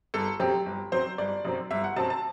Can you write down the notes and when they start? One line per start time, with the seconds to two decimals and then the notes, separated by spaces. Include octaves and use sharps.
0.14 G1 A4
0.40 F#2 F#3 C4 G4
0.66 G1
0.92 F#2 F#3 C4 C5
1.18 G1 D5
1.45 F#2 F#3 C4
1.71 G1 E5
1.84 F#5
1.96 F#2 F#3 C4 A5
2.10 A5